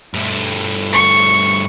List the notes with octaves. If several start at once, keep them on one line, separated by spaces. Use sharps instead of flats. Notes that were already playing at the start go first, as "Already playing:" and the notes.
G2 A3
C#6